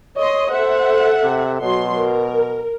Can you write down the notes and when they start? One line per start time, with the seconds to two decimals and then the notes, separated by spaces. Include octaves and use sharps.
0.16 C#5 D#5 C6
0.50 A4 C5 E5 F#5
1.24 C3
1.61 B2 F#3 C6
1.97 A#4